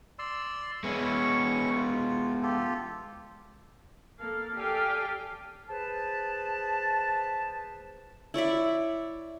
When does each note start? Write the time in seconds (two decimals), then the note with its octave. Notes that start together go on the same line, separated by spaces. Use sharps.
0.19 D5 C6 E6
0.84 G#3 B3 C#4 E4 C#6
1.75 F4
2.43 F4 G4 A4
4.18 A#3 A4 F5
4.56 G4 A4 D5 F5 G5 G#5
5.69 G#4 B4 C5 A5
8.34 E4 C#5 D5 E5